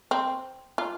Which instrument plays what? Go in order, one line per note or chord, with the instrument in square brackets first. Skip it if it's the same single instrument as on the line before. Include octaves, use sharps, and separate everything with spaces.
[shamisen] C4
F4